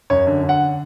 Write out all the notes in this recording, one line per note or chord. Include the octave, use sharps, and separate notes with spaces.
F#2 C#5
D3
D3
F#5